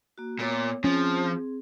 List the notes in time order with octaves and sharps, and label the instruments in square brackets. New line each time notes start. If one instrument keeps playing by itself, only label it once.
[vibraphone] A#3 F#4
[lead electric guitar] A#2 [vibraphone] B3 C#5 D6
[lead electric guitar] F3 [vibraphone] C4 G#4 [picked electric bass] C#4